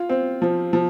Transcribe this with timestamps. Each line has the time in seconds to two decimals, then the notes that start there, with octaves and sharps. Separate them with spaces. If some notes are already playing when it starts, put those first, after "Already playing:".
Already playing: F4
0.09 C4
0.42 F3
0.73 F3